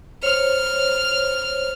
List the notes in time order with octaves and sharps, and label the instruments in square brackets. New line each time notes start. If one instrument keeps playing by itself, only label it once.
[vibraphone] C5 C#5 [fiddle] F6